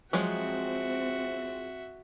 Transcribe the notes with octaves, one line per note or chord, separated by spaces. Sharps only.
F3 F#3 G#3 C4 F#4 E5